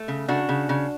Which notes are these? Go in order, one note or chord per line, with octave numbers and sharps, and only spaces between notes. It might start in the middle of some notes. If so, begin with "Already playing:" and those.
Already playing: A3
C#3
C#3 D4 F#4
C#3
C#3